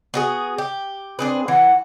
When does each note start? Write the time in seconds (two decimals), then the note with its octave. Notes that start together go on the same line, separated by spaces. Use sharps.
0.14 B3 F#4 G#4
0.58 G4
1.19 C4 D4 G#4 B4
1.48 E3 F#5